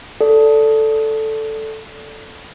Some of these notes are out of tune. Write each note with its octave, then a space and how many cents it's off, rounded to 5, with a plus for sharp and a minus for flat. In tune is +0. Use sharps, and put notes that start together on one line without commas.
A4 +0 D5 -15